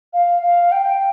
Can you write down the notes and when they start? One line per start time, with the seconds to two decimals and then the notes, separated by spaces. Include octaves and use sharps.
0.14 F5
0.42 F5
0.72 G5